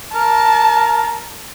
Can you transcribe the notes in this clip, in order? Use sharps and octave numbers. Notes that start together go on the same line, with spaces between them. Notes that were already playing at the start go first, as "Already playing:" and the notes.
A#4 A5